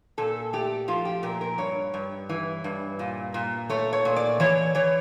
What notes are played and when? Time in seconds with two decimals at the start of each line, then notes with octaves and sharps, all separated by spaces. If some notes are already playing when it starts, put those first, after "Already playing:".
0.18 A#2 A4
0.53 A3 G4
0.88 F3 F4
1.05 G4
1.23 A#2 A#4
1.41 A#4
1.58 G2 C#5
1.94 G2
2.29 E3
2.64 G2
2.99 A#2
3.34 A#2
3.70 A3 C#5
3.93 C#5
4.05 A#2
4.16 D5
4.40 E3 C#5
4.75 E3 C#5